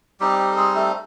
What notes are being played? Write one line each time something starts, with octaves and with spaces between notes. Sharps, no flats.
G3 C4 D#4 G4
G4
A4
G#3 G#4
A3 A4